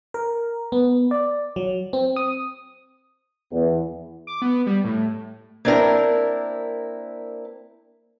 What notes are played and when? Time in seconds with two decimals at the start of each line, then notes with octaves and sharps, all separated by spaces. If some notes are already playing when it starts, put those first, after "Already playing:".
0.14 A#4
0.72 B3
1.11 D5
1.56 F#3
1.93 C4
2.16 D#6
3.51 E2
4.27 D6
4.42 B3
4.67 G3
4.85 A2
5.65 A#3 C4 D4 E4 A#4